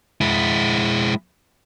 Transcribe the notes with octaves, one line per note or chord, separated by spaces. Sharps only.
G#3 E4